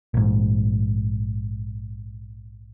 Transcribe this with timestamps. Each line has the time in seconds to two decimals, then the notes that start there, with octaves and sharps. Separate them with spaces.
0.14 A#1 G#2